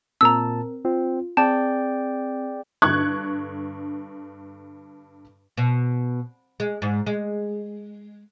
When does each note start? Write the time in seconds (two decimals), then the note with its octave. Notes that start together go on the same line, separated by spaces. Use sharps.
0.21 A#2 C4 A#4 A5 A#5 E6
0.85 C4 F4
1.37 C4 G#4 D5 G5 A5
2.82 G2 D3 C#6 F#6 G#6
5.57 B2
6.60 G#3
6.82 G#2
7.06 G#3